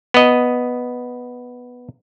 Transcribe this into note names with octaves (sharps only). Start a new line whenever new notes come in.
B3 D#5